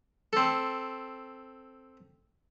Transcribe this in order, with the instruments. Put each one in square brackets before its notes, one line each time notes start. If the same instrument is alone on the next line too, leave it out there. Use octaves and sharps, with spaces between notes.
[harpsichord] C4 A4